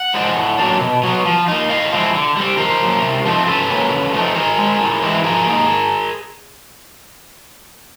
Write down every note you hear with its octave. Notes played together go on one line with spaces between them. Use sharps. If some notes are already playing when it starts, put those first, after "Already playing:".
Already playing: F#5
F3 G#3 C4
A2
F#3 A#3 D4
B2
F#3 B3
F3
A#3 D#4
A2 D#5 F5
F3 G#3 C4 E4
D3
G3 C4
D#3 A#4 C5
F#3 A#3
C3
F3 A3 C4 D#4
C#3 A4 B4
F#3 A#3 C#4
C#3
F3 A3 C4 D#4
D#3 G#4 A#4
G#3 C4
A2
E3 G#3 C4 E4
F3 G#4 A#4
A#3 D#4